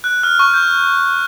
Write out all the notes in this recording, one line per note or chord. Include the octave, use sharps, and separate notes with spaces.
F#6
F6
C#6
G6